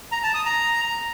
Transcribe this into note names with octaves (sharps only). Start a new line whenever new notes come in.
A#5
A5
D#6
A#5